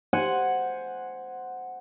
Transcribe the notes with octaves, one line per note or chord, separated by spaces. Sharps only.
C5 F#5 G#5